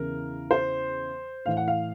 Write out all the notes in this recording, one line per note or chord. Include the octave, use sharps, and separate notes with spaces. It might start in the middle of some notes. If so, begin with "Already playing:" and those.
Already playing: E2 C#3 E3 A#4
C5
A2 E3 F5
F#5
F5